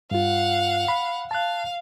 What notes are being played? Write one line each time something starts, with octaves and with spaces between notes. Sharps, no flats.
G2 F4 F5 F#5
B5
F5 A5 F#6